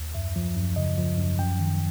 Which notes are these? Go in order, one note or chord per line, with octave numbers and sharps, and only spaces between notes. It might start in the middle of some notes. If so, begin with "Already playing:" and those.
Already playing: D#2
F#2 E5
F3
F#2
C#3 D#5
F3
F#2
F#2 G5
D#3